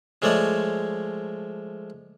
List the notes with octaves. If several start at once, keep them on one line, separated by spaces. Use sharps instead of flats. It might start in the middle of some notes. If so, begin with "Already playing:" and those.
F3 G#3 A3 C#5 D5